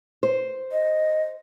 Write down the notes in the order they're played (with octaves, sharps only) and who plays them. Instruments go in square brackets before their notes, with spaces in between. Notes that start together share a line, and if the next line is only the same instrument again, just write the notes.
[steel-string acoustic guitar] C5
[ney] D#5